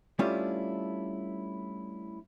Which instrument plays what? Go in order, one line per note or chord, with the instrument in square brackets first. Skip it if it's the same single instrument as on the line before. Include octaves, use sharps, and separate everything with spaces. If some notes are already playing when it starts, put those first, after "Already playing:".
[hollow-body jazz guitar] G3 A3 C#4 D4 E4 F4